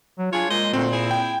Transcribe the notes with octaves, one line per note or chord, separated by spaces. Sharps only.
F#3
D4 F4 G#4 C#5
A#2 G#3 C5 D#5
D2 A#2 C4
E4 G#4
G5